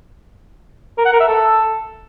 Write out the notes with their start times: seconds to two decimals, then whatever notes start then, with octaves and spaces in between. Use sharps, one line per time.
0.98 A#4
1.06 F#5
1.13 A#4
1.20 E5
1.28 A4